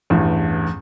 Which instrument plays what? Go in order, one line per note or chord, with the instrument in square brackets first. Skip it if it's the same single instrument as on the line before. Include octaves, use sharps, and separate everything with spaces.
[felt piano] A1 E2 G2